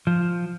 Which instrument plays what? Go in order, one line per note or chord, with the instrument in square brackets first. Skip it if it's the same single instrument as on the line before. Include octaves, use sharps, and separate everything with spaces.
[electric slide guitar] F3